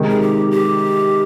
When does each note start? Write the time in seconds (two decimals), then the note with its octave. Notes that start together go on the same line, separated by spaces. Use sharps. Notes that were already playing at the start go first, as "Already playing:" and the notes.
Already playing: C3 D#3 G#3 D#4
0.10 G#4
0.21 G4
0.51 G4